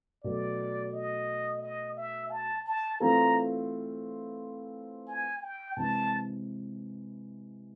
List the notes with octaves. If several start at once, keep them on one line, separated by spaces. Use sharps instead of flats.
B2 F#3 A3 D5
D#5
D#5
E5
A5
A5
E3 A3 C4 F4 A4 A#5
G#5
G5
C3 E3 G#3 A5